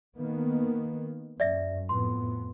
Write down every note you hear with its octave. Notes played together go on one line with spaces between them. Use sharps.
D#3 A#3 B3
F#2 D5 E5 A#6
F2 A2 B3 C6